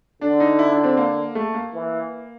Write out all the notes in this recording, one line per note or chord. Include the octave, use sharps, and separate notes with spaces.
D3 D4
D#4
E4
D4
C4
A#3
A3
A#3
E3